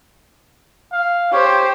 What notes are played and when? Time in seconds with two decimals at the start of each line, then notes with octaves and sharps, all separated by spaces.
0.92 F5
1.32 G4 C5 C#5